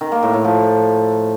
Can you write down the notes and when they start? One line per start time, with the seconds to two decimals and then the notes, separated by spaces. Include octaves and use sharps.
0.01 D#3
0.12 A#3
0.23 A2
0.33 A2
0.44 F3